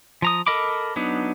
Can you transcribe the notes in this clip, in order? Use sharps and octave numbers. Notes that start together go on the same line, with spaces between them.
F3 A#5 D#6
A4 A#4 D#5 B5 D6
F#3 B3 D4 D#4